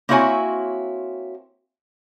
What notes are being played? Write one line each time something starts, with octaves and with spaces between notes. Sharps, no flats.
A#3 C4 E4 F#4 C#5 G#5